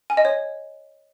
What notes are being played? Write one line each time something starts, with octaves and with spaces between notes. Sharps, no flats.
G#5
D#5
C#5